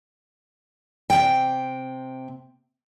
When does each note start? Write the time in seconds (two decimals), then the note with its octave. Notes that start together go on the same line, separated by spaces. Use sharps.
1.10 C3 G5